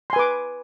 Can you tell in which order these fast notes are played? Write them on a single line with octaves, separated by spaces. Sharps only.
C6 G#5 B4 D6